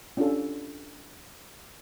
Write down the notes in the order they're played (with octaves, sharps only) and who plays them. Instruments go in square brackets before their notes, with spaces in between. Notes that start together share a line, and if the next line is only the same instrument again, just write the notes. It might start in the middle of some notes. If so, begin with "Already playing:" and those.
[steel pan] C#4 D4 F4 G4 A4